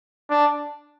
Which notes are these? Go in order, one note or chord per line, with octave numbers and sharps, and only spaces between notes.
D4